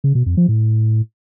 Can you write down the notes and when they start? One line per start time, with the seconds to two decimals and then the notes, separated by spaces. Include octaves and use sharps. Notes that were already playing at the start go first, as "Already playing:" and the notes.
0.04 C#3
0.15 B2
0.26 F2
0.37 F3
0.48 A2